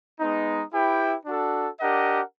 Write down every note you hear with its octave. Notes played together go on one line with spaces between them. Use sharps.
G#3 B3 D#4
E4 G4 B4 E5 G5
D4 F#4 A4
D4 G4 A#4 D#5 F#5